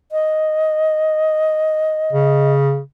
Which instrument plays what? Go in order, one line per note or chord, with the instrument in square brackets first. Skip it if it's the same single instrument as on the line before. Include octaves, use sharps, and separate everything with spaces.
[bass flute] D#5
[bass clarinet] C#3